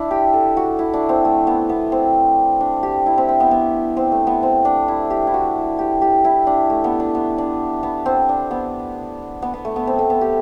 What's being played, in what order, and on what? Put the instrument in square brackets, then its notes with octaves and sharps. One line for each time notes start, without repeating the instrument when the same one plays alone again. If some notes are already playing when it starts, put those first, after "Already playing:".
Already playing: [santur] D4 E4
G4
A4
F#4
E4
D4
C4
A3
B3
B3
C4
D4
G4
E4
C4
C4
B3
B3
C4
A3
B3
C4
D4
E4
G4
E4
F#4
G4
G4
E4
D4
A3
B3
D4
B3
D4
B3
C4
D4
B3
B3
B3
A3
B3
C4
A3
B3
G4